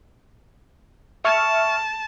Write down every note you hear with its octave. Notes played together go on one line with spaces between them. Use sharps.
E5 A5 C#6 F6